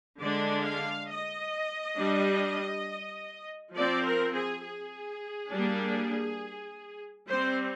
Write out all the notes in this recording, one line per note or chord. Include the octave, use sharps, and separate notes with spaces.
D3 G#3 D4 D5
F5
D#5
G3 D4
F3 C4 D5
A#4
G#4
G#4
G3 A#3 D4
G3 C4 C5